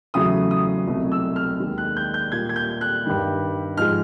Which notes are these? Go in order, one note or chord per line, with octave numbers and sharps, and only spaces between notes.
E2 C#3 F#3 A3 D#6
D#6
C2 B2 F#3 A3
E6
F6
D#2 D#3 G#3
F#6
G6
G6
A#2 G3 G#6
G#6
G6
F#6
G2 D#3 G3
G#2 F3 G#3 F6